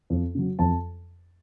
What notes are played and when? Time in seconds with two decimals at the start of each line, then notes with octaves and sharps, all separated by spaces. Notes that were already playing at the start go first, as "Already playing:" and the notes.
0.10 F2
0.35 C#3 F#3
0.59 F2 A5